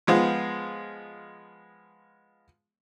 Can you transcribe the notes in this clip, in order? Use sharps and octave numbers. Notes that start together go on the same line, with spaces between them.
F3 G#3 B3 F4